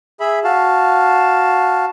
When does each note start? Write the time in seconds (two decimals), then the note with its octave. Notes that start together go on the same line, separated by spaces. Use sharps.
0.20 G#4 E5 B5
0.44 F#4 F5 A5